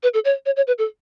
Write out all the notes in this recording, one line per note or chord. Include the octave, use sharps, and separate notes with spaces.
B4
A4
C#5
C#5
C#5
B4
A4